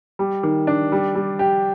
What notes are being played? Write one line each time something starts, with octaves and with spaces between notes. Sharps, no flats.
G3
D#3
D4
G3
G3
G4